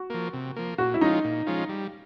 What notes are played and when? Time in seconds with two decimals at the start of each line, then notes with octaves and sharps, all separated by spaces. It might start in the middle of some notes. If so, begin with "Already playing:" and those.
Already playing: F#4
0.10 F3 A#3
0.33 C3
0.56 F3 A#3
0.78 A#2 F#4
0.94 E4
1.01 F3 G#3 C#4 D#4 F4
1.24 A#2
1.47 F3 G#3 C#4 F4
1.69 G3